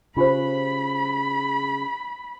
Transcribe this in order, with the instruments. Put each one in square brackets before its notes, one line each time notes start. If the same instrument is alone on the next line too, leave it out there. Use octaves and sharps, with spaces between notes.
[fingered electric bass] C#3 [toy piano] F4 G4 C5 [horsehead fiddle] B5